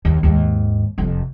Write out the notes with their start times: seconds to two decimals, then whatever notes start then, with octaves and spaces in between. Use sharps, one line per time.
0.05 D#2
0.23 D#2 G#2
0.98 F1 F2